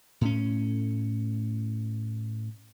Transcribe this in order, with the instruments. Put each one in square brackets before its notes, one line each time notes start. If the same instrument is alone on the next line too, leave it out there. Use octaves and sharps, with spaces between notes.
[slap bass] A2 C#4